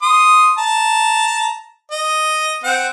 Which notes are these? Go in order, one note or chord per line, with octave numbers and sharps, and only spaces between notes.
C6 D#6
A5 A#5
D#5
C4 F#5